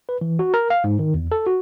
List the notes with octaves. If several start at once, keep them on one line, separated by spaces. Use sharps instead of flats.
B4
E3
F#4
A#4
F5
G#2
D#3
E2
A4
F#4